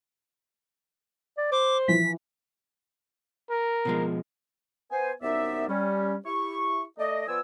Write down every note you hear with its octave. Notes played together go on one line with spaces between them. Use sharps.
D5
C5 D6
E3 F3 B6
A#4
B2 F3 G#3
B3 C5 G#5
C2 F#2 B3 D#4 D5 E5
G3 C#4
E4 G4 C#6
A3 D5 D#5
F3 B3 F4 D5 G#5 E6